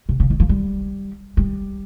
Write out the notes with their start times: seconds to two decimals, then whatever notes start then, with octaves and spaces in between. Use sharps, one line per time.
0.09 C3
0.20 C#3
0.30 D#3
0.40 F3
0.49 G3
1.37 G3